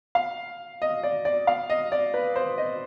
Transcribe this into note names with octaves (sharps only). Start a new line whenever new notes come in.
F5
D#5
D5
D5
F5
D#5
D5
B4
C5
D#5